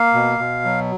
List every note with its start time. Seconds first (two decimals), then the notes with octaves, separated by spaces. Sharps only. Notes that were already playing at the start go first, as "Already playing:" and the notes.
Already playing: A#3 F5
0.14 B2
0.39 B2
0.65 F#3